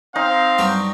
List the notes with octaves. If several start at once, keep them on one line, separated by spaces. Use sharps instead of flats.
C4 D#4 F5
G2 F#3 G4